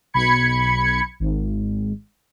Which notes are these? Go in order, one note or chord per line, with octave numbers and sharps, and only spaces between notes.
B1 B5 G#6 C#7
G#1